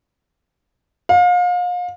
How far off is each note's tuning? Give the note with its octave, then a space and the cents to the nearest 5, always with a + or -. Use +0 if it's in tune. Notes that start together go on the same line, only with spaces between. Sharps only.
F5 +35